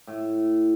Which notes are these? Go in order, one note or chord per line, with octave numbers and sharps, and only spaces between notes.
A2